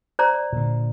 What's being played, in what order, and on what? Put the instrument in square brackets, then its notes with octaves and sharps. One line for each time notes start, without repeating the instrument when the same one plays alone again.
[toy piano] C5 D5 A#5
[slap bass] A#2 D3